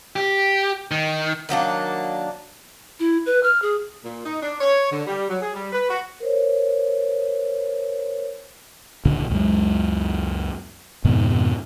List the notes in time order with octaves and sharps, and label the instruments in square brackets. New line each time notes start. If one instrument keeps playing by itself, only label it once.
[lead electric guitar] G4
D#3
[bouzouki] D#3 F#3 A#3 D4
[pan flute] E4
B4
F6
G#4
[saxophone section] A#2
D#4
D4
C#5
D3
G3
F#3
G#4
G3
B4
F#4
[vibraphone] A#4 C5 C#5
[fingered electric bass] C#2 A#2 D3
C#2 F#2 G#3
F2 G#2 B2 D#3